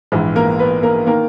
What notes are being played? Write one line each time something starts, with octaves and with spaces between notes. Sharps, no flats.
A#1 G#2 E3
A#3 A#4
B3 B4
A#3 A#4
D#3 A#3 A#4